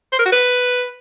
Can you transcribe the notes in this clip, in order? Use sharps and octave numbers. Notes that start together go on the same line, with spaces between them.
C5
A#4
F#4
B4